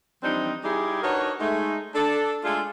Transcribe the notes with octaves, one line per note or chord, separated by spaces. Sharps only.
E3 F3 G3 C4 D4 D#4
G3 D#4 E4 G4 G#4
D4 D#4 F#4 A#4 B4 C#5
G#3 A3 D#4
D4 A4
G#3 A3 D4 F4 G#4 A4